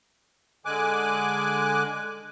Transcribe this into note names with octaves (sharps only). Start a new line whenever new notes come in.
D3 G#3 G#5 D6 F#6